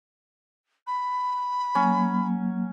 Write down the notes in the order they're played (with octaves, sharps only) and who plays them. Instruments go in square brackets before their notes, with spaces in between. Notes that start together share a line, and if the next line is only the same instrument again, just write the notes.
[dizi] B5
[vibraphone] F#3 A#3 [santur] C#4